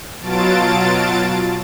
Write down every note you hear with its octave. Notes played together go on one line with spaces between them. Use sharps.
B2 F#3 F4 A5 A6 D7